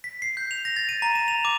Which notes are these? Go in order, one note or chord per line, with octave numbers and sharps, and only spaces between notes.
B6
C7
G6
F7
A#6
A6
D#7
A#5
E7
F7
D6